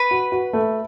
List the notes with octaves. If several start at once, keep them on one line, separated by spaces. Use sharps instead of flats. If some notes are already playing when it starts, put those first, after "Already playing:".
Already playing: B4
F#4
F#4
A3